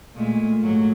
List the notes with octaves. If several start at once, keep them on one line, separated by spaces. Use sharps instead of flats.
A#2 G#3 A3
G#2 F#3 A3